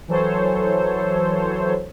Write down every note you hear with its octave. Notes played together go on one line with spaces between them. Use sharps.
E3 F#3 A4 C5 C#5